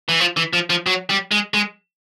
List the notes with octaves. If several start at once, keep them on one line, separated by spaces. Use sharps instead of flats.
E3
F3
E3
F3
F3
F#3
G3
G#3
G#3